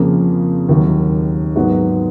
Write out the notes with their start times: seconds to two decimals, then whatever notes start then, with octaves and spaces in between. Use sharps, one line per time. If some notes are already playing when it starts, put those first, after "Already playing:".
Already playing: F2 C#3 F3 A#3
0.69 D#2 D#3 F#3
1.56 G#2 F#3 B3 F#4